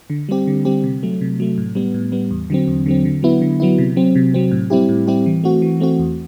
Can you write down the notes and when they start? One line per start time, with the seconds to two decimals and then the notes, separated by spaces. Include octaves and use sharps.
0.10 D3
0.29 G3 C4 G4
0.47 D3
0.65 G3 C4 G4
0.84 C3
1.03 F#3 A3
1.21 C3
1.40 F#3 A3
1.58 A2
1.75 G3 B3
1.94 A2
2.12 G3 B3
2.31 E2
2.50 D3 F#3 C4
2.68 E2
2.86 D3 F#3 C4
3.05 D3
3.23 F#3 B3 E4
3.42 D3
3.60 F#3 B3 E4
3.78 C3
3.96 F#3 C4
4.16 C3
4.34 F#3 C4
4.51 A2
4.70 G3 C4 E4 G4
4.89 A2
5.07 G3 C4 E4 G4
5.26 E3
5.44 A3 C4 F#4
5.62 E3
5.80 A3 C4 F#4
5.99 E2